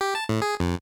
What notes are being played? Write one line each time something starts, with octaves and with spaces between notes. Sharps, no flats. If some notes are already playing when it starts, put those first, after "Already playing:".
G4
A5
A2
G#4
F2